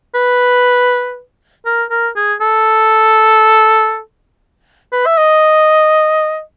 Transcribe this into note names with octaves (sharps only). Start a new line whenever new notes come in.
B4
A#4
A#4
G#4
A4
B4
E5
D#5